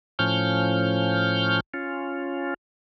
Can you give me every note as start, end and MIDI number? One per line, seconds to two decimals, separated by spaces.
0.19 1.60 45
0.19 1.60 53
0.19 1.60 61
0.19 1.60 89
0.19 1.60 91
1.74 2.54 61
1.74 2.54 65